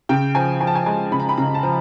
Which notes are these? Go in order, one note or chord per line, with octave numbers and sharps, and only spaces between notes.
C#3 G5
F3 G#5
F3 G#5
A5
G#5
G#3 G#5
C#3 B5
A#5
B5
C#3 A#5
A5
F3 A#5